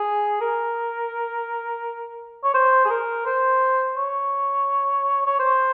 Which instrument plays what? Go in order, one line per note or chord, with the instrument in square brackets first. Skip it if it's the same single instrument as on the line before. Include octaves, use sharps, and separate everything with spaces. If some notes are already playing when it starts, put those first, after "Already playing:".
Already playing: [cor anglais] G#4
A#4
C#5
C5
G#4
A#4
C5
C#5
C#5
C5